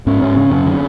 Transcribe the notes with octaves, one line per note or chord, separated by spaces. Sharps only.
G#2 C#4
G#2 C#4
C#3 C#4
F#2 C#4
D3